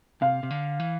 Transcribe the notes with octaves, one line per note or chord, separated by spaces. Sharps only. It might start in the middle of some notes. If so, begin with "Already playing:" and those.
C3 F5
C3
D3
E3